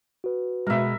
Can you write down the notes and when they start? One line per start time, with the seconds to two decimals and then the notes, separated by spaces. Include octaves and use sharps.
0.24 F#4 B4
0.67 B2 G#3 A#4 E5